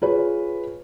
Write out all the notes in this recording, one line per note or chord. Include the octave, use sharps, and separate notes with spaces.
F4 G#4 B4 C#5